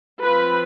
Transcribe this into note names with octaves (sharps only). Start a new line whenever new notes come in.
F3 C4 F4 B4 B5